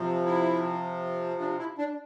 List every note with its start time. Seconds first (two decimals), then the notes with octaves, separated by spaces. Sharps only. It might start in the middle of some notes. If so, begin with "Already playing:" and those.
Already playing: C3 F3
0.26 E4
1.40 D4
1.59 E4
1.78 D4